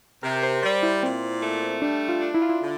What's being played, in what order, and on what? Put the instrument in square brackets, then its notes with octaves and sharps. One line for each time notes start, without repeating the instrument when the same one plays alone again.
[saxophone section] C3 [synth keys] A#4
[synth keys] C5
[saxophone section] G3 [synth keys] C5
[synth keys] E4
[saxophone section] A#2 [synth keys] C4
[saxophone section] A3
[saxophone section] G3 [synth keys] D4
[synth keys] F4
[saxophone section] D4
[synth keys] E4
F4
E4
[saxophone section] D3